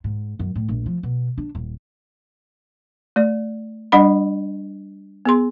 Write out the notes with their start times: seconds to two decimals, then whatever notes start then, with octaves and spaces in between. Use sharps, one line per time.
0.04 G#2
0.39 F#2
0.55 A2
0.68 A#1
0.86 F3
1.03 B2
1.38 D4
1.55 D#1
3.16 A3 D5
3.92 G3 D4 D#5 F#5 B5
5.25 B3 G#4 C6